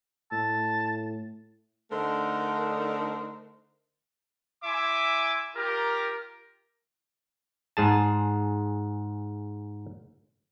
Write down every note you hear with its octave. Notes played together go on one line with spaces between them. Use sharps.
A2 A5
D3 A3 D4 D#4 A#4 C5
E4 E5 G#5 C6 D6
F4 G4 A#4
G#2 G#4 A5